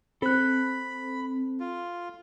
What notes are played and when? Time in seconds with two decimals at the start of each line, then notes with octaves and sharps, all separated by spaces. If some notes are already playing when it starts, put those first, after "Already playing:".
0.22 C4 A4 B5 F#6
1.60 F4